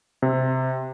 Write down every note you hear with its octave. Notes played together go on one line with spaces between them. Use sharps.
C3